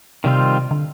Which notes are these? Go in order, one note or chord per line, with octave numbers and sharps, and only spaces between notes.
C3 D#3 G3 C4 F4
D3